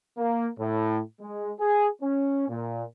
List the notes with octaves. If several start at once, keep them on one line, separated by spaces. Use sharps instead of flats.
A#3
A2
G#3
G#4
C#4
A#2